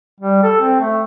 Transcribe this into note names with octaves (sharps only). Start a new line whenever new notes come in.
G3
A4
C4
A3